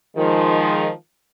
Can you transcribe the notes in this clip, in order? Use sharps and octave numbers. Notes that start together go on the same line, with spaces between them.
D#3 F3 G#3